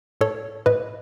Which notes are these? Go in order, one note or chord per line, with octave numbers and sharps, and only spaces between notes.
A2 A4 C#5
A2 B4 D#5